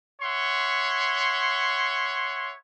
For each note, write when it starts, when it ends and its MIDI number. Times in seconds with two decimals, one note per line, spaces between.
0.22 2.55 73
0.22 2.55 76
0.22 2.55 78
0.22 2.55 84